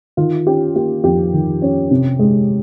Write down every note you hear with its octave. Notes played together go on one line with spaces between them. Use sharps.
D#3 F4
C#4 G4
A#3 G4
F2 G4
D#3
C#4
C3
G#3